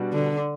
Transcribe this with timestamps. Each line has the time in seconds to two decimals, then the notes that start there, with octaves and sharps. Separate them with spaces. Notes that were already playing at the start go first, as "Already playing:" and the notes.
Already playing: B2 G3 D4 F#4
0.13 D3